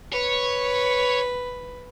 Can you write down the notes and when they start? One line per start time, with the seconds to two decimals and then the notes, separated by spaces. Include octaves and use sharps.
0.13 B4 C#5